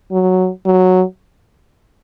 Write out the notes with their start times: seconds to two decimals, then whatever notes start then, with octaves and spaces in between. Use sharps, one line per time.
0.12 F#3
0.66 F#3